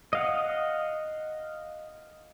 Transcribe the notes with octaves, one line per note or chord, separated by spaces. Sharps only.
D#5 F5 F#5